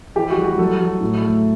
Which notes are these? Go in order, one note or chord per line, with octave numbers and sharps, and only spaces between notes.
E3 G4
F#4
G3
F#4
F#3 F#4 A4
F#3
A2
A3